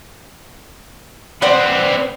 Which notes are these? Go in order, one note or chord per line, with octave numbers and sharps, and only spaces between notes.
B3 C4 D5 F#5